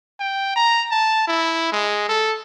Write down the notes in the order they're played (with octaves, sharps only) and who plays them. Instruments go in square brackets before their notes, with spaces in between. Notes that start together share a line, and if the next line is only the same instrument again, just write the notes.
[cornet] G5
A#5
A5
E4
G#3
A4